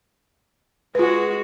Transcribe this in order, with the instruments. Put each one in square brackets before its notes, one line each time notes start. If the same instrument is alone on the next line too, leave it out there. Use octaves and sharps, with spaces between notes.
[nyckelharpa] G#3 F#4 [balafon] F4 B4